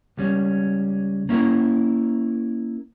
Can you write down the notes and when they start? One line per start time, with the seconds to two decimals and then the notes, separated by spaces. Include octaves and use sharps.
0.17 C#2 G3 C#4
1.29 A#3 C#4 E4 A#4